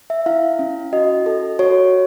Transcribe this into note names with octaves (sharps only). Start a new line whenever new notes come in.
E5
E4 F5
C#4
F#4 D#5
A4
F#4 C#5